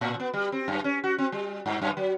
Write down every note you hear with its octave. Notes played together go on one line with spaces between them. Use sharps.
A2
B3
G3
C4
F#2
C#4
F#4
C4
G3
G2
F#2
F#3